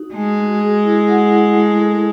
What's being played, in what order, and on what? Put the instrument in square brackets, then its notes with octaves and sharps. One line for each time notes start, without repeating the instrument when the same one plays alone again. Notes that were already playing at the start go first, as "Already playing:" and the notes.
Already playing: [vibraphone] D#4 F#4
[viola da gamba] G#3 [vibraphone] A3
[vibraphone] F#4
G#4
E4
F#5
E4
A3
A4